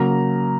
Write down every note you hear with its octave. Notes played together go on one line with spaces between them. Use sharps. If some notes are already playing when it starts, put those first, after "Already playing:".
Already playing: C#3 F#3 A#3 A#5